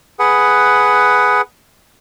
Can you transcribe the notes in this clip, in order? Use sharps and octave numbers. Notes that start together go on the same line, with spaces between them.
G#4 B4 F#5